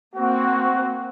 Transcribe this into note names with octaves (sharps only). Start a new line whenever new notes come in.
A#3 C4 F#4